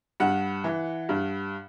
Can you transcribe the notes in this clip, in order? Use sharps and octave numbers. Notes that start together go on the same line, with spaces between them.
G2 F#5
E3
G2